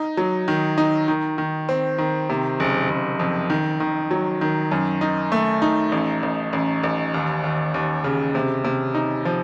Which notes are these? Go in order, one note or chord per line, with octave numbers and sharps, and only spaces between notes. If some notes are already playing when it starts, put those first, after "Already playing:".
Already playing: D#4
F#3
D#3
D#4
D#3
D#3
C4
D#3
C3
F#1
F#1
F2
D#3
D#3
F#3
D#3
F#2
D#4
A3
D#4
A1
A1
A1
A1
D#2
D#2
D#2
C#3
C3
C3
D#4
F3